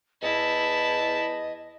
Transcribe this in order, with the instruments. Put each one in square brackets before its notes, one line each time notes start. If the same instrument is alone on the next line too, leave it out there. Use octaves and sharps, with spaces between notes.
[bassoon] E2 [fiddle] E4 A5 [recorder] D#5